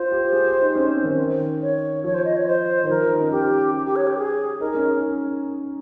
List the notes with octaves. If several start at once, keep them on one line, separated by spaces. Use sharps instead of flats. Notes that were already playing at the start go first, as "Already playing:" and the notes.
Already playing: F4 C5
G4
G#4
G4
D#4
C#4
C4
D#3
C#5
F3 C#5
C5
D#5
C#5
C5
D#3
F3 A#4
D#4
C#4
C#4 G4
G4
G4
C#5
G4
G#4
D#4 A#4
C#4